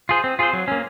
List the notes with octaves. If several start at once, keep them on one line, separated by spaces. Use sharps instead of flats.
F4 G#4 C5
C4
F4 G#4 C5
F#3
A#3 C#4